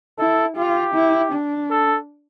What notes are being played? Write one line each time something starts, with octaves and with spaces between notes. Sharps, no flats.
E4 A4
F4 G4
E4
D4
A4